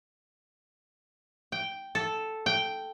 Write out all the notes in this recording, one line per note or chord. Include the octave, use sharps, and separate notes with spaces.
G5
A4
G5